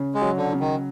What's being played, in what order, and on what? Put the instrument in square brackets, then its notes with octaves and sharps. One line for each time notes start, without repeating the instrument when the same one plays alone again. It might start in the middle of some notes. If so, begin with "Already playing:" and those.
Already playing: [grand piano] C#3
[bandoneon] G#3
[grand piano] F#3
[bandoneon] D3
[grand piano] C#3
[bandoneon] D#3